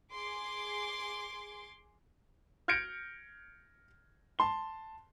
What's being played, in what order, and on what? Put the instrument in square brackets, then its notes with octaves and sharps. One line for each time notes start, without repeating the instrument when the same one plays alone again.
[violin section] G#4 C6 D6
[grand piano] F6 G6 G#6 A#6 C#7 D7
A5 C6 G7